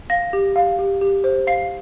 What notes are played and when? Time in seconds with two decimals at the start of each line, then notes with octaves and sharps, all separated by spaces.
0.10 F5 A#6
0.33 G4
0.56 F5
0.79 G4
1.01 G4
1.24 C5
1.47 F5 C7